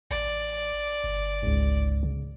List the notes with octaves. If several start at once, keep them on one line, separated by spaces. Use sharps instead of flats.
A1 D5
G1
C#2 G#2
C#3